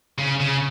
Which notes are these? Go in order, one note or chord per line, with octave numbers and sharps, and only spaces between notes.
C#3
C#3